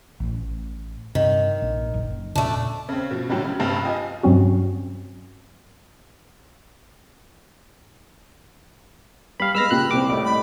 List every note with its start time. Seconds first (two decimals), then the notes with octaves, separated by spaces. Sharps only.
0.20 A1
1.15 G2 C3 D#3
1.62 A#1
1.94 F#1
2.35 E2 A#2 C#3 A3 D4
2.89 C#3 C4
3.11 B2 F3
3.30 A2 D3 F#3 G3
3.45 C#3
3.60 F1 G2 C3 A5
3.83 F4 G4 D#5 G#5
4.23 G2 C3 F#3 C4 C#4 F#4
9.40 G3 F5 B5
9.55 G#3 B3 B5 E6 F6 A#6
9.71 A#2 C#3 G4 F#6
9.91 C2 C4 G4 D6
10.10 A2 G3 D#5
10.25 B5